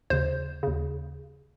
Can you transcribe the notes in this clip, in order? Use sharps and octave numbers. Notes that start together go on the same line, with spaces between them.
D#2 C#3 C5
D#2 C#3